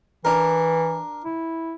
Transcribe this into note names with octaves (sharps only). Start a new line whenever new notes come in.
E3 D4 A#4
E4